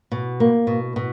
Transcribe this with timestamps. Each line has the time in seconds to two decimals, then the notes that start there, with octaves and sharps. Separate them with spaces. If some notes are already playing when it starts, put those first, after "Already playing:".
0.12 B2
0.40 A#3
0.67 B2
0.96 B2